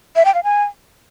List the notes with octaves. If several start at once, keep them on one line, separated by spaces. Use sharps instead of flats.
E5
G5
F5
G#5